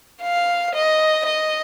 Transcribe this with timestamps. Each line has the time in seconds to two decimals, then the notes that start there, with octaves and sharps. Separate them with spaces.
0.22 F5
0.75 D#5
1.25 D#5